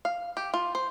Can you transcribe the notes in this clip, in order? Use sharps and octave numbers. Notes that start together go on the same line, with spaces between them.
F5
G4
F4
C5